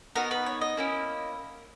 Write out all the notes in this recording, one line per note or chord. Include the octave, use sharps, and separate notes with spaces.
B3 D#4 F#4 A#4
B4
C#5
D#5
A#3 C#4 E4